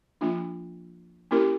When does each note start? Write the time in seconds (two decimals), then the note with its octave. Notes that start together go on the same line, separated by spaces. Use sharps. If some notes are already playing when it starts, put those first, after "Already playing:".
0.21 F3 A#3 D4 F4
1.31 A#3 C#4 E4 G4 A#4